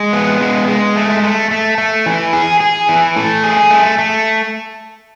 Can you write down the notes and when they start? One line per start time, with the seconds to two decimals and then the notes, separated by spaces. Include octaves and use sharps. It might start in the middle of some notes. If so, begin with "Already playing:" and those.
Already playing: G#3
0.13 B3
0.41 G#3
0.68 G#3
0.95 A3
1.23 A3
1.51 A3
1.78 A3
2.06 E3
2.33 G#4
2.60 G#4
2.89 E3
3.16 A3
3.43 G#4
3.71 A3
3.98 A3